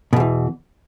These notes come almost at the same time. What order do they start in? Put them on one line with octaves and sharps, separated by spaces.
B2 E2 E3